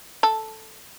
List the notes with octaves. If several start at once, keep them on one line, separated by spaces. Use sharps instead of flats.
A4